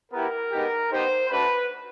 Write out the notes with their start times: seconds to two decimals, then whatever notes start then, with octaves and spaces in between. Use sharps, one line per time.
0.11 B3 E4 G4 A#4
0.51 G#3 B3 D#4 G4
0.90 B3 D#4 G4 C5
1.29 A3 D4 F#4 B4